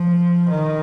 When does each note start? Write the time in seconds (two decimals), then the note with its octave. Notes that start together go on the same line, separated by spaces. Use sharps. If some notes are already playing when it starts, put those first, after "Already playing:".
Already playing: F3
0.49 D#3